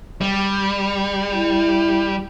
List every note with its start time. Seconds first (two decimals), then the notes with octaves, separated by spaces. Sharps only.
0.21 G3
1.33 E4